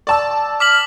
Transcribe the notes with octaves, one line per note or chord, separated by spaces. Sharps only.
D5 A5 E6
D6 F6 B6 F#7